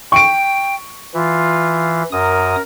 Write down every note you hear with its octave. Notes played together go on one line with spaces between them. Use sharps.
G5 C#6 D7
E3 F4
F#2 A#4 D#6